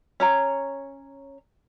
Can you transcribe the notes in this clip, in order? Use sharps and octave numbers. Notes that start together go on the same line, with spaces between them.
C#4 C#5 A#5